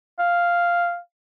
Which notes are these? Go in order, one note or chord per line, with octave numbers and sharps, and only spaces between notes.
F5